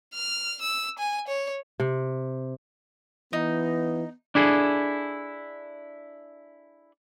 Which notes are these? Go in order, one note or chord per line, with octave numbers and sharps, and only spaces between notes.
F6
E6
G#5
C#5
C3
E3 B3 D#4
D4 E4 G#4 A4